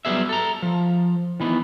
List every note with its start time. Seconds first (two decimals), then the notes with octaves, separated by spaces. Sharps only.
0.05 F#3 G3 B3 G#4 E5
0.29 A4 A#5
0.62 F3
1.40 D#3 E3 B3